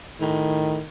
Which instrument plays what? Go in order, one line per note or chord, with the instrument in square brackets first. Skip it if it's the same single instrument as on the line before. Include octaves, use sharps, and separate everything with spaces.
[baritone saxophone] A2 [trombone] D#3